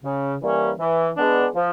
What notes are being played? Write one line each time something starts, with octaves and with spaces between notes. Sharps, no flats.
C#3
E3 G3 A#3 C#4
E3
G#3 B3 D4
F3